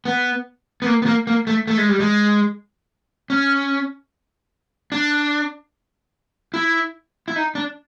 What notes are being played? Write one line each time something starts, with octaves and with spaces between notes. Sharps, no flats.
B3
B3
A#3
B3
A#3
A#3
A3
A3
G#3
G3
G#3
C#4
D4
E4
E4
D#4
D4